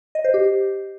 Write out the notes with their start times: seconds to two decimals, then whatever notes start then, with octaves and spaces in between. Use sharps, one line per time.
0.15 D#5
0.24 C5
0.34 G4